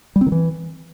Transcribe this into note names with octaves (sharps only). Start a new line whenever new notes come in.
G3
C4
D#3
E3